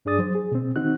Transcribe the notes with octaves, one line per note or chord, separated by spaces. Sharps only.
G2 D4 G#4 D5 D#6 A6
F#3 C5
G#4
B2 C4
D#3 C4 D#4 F#4 F#6